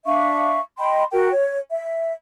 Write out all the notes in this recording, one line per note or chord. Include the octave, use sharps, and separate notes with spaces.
D4 E5 F5 C#6
D#5 G5 B5 C6
F#4 A#4 G5
C#5
E5